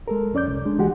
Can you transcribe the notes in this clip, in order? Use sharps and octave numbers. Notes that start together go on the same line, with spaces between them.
G#3 A4 A#4
F2 C#4 D5 D6 G6
C2
G#3 D4
D2 E3 G#3 F#4 G4 F#5